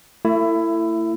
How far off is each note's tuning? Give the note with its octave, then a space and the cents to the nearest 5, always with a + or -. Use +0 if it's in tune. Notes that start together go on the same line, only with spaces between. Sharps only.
A3 +35 E4 +15